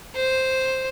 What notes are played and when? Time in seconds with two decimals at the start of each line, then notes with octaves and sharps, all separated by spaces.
0.16 C5